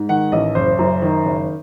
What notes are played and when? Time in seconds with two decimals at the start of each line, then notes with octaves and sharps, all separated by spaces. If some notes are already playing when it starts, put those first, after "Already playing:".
Already playing: G#2
0.09 D#3 F#5
0.32 A1 D#5
0.55 F#1 C5
0.79 F#2
1.02 D#3
1.25 F#1